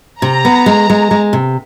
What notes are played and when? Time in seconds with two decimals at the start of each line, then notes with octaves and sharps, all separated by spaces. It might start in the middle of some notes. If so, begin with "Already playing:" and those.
0.22 C3 A#5
0.45 B3
0.66 G#3
0.90 G#3
1.11 G#3
1.33 C3